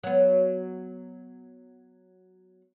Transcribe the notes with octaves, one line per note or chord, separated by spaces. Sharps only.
F#3 B3